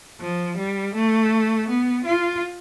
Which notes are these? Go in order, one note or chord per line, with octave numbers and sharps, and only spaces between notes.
F3
G3
A3
B3
F4